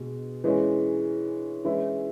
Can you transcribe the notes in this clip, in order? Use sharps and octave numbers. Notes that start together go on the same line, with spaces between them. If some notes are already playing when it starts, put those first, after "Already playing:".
Already playing: B2 G#3
E3 G#3 C#4
E3 G#3 C#4 E4